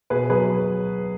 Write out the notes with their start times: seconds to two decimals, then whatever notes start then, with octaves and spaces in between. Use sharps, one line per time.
0.10 B2 G#4 B4
0.30 F#3 G#4 B4